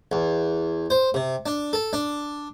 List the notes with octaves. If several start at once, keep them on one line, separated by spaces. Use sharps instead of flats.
E2
C5
C3
D4
A4
D4